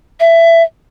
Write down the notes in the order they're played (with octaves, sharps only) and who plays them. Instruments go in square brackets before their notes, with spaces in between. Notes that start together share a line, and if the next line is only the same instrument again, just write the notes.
[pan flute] E5